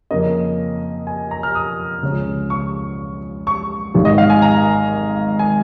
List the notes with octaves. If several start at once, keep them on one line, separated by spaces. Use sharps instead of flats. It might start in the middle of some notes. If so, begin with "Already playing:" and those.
F2 C#3 A#3 C#4 D#5
G#5
A#5
F6
D#6
C#2 C#3 F3 C#4
C#6
C#6
G#1 G#2 D#3
D#5
F5
G#5
A#5
G#5